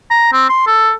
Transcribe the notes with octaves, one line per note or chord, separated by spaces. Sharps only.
A#5
C4
C6
A4